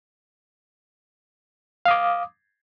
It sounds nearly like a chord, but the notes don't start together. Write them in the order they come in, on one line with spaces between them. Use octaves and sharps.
F5 D#6 D6